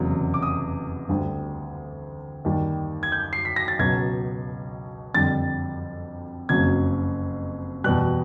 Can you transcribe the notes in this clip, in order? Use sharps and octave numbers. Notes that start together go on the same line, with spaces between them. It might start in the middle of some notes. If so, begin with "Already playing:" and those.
Already playing: F1 E2 C#3 F#3
D6
D#6
D2 D3 G3
D#2 D#3 G3
G#6
G6
C7
B6
A#6
A6
C#2 B2 F#3 G#6
F2 D3 G3 A6
F#1 F2 C#3 F#3 G#6
E2 B2 G3 F#6